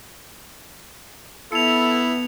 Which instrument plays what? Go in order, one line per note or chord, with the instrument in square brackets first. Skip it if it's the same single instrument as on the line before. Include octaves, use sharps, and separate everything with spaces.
[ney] B3 [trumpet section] E4 [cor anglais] A4 [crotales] C#7 F7